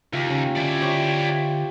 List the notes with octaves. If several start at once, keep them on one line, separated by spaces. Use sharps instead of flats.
D#2 C#3 F4 G4
C#3 C#4
D3 E4 D5 D6
G4 C5 C#5